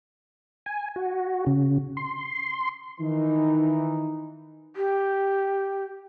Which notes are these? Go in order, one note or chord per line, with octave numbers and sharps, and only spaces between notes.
G#5
F#4
C#3
C6
D#3 E3 D#4
G4